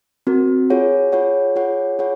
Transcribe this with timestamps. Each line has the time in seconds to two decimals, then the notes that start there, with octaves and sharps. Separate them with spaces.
0.27 C4 F#4 A#4
0.70 F4 G#4 C#5 F#5
1.12 F4 G#4 C#5 F#5
1.56 F4 G#4 C#5 F#5
1.99 F4 G#4 C#5 F#5